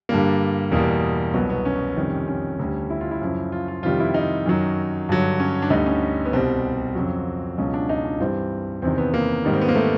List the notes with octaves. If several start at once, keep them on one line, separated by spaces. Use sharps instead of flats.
G2 D3 G3 A#3
E2 B2 G3 A#3
C2 B2 F#3 B3
B3
C#4
F2 C3 D#3 G3
C#4
D2 D3 G3
E4
F4
E4
F#2 C#3 F3
F4
F4
F2 C3 D#3 G3 F4
E4
D#4
F#2 D#3 F#3
G2 D3 F#3
C#4
D4
D2 D3 G3 D#4
C#4
B3
C2 B2 G3 C4
F2 C#3 F#3
C#2 B2 F#3 C#4
D4
D#4
D4
G2 E3 G3 C4
E2 C3 D#3 C4
B3
A#3
G#2 D#3 G3
C4
B3
A#3
A3